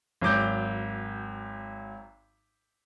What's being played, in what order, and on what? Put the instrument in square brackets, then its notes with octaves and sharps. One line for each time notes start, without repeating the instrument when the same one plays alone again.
[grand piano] G#1 F#3 D6 G6